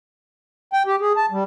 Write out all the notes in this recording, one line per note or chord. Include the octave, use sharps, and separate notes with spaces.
G5
G4
G#4
A5
G3